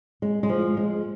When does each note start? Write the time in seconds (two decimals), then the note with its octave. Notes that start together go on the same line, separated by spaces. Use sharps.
0.22 G#3
0.43 G#3
0.49 F3
0.77 G#3